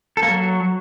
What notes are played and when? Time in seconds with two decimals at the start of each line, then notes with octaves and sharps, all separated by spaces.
0.17 A4
0.23 A#3
0.28 F#3